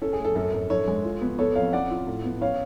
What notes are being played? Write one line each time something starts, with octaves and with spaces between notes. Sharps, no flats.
C#4 A4
G#4
A3
A4
F#2 A4
F#2
D4 A4 C#5
G#3
F4
B3
B3 A4 C#5
F2 C#5 F5
C#4 D5 F#5
F4
A2
B3
C#4 C#5 F5